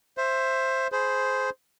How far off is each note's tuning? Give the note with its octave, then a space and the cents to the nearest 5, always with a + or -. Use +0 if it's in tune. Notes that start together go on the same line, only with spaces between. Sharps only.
C5 +10 E5 +15
G#4 +20 C5 -5 B5 +0